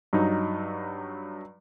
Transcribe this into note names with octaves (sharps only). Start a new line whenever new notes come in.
G2 F#3 D#4